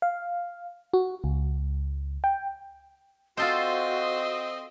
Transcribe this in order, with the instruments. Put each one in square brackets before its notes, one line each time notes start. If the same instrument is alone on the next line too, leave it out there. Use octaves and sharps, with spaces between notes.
[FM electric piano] F5
F#4
C#2
G5
[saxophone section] C4 D#5 [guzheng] F4 A4 C5 [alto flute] F#4